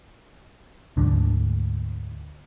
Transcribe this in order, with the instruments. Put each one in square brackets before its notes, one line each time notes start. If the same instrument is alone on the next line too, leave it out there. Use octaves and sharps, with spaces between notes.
[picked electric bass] D2 G#2 D3